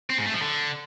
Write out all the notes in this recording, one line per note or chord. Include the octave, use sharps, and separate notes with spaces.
C4
G#2
A3
F3
D3